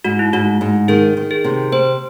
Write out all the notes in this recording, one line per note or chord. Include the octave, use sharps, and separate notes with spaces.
G#2 F#4
E4
G#2 F#4
G#2
D#3 G#4
D#3
G#4
C3
C4 C5